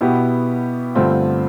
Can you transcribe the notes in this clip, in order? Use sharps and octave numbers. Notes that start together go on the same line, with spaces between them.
B2 B3 E4 G4
G2 D3 A3 C4 F4